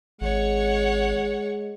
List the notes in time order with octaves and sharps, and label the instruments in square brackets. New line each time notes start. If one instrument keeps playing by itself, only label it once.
[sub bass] G#1 [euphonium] G#3 [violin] C#5 F#5